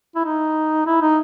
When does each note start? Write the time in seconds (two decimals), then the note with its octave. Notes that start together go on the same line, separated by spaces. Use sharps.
0.15 E4
0.25 D#4
0.86 E4
1.02 D#4